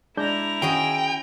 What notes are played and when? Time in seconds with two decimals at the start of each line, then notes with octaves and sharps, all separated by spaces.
0.17 G#3 D4 E4 A#5 G6
0.62 D#3 C#4 F#4 G#4 G5 G#5